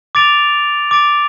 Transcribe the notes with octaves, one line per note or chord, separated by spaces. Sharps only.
D6 A6 D7 F7
D6 A6 D7 F7